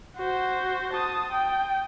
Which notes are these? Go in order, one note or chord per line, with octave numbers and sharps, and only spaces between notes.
F#4 C5
A5 D#6
G5